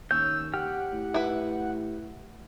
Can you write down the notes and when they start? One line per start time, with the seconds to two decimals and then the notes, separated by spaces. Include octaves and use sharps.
0.11 D#2 C#4 E6 G6
0.54 G4 F#5 G5 F6
0.93 A2
1.14 E4 B4